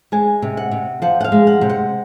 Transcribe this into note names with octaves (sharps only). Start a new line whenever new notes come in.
G#3 G#5
C3
F#5
C3
F3 F#5
F#5
F5
G#3
F#5
C3
F#5